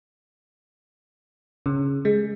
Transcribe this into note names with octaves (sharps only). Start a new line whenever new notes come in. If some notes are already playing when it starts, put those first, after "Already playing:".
C#3
G#3